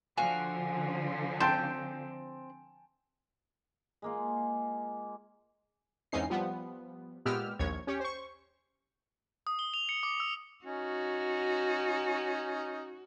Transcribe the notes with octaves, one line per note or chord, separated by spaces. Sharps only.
D3 F3 F#4 F5 G#5
C4 G5 A5 C6 G6
G#3 A#3 F4
E2 G#2 C4 C#4 D#4 C7
F3 G3 B3
A#2 G#3 B3 G4 E6 F6
A#1 D#2 C#5 G#6
C#4 G4 C#5
C5 C#6
D#6
G7
F7
C#7
D6
E6
C#4 D#4 F#4